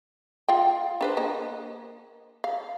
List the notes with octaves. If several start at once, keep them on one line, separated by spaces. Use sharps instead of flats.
F4 F5 G5
D4 B4 C5
A#3 D#5
F5